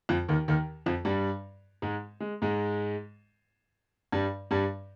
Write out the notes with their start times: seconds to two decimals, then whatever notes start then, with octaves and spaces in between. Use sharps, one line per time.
0.09 F2 F3
0.29 D#2 D#3
0.48 D#2 D#3
0.86 F2 F3
1.05 G2 G3
1.82 G#2 G#3
2.20 G#3
2.42 G#2 G#3
4.12 G2 G3
4.51 G2 G3